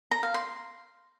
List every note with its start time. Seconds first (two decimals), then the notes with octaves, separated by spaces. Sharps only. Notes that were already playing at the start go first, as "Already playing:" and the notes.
0.11 A#5
0.23 F5
0.34 C6